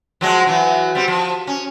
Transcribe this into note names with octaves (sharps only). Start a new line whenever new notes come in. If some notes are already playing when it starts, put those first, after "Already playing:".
F3 F#3 G#3
E3 F#3
G3 C4
F3
C#4